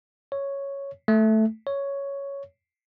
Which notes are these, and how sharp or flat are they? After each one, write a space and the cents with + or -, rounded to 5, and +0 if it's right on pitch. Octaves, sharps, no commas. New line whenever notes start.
C#5 +0
A3 -5
C#5 +5